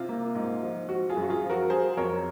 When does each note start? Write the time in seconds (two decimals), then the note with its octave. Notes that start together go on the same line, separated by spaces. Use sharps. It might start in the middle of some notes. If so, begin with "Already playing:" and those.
Already playing: C3 F4
0.09 A#3
0.35 G#2
0.63 F3
0.89 C4 F#4
1.10 F4 G#4
1.17 F#2
1.23 F#4
1.29 F4 G#4
1.44 F3
1.50 F#4 A#4
1.70 F#3 G#4 C5
1.97 F2 A#4 C#5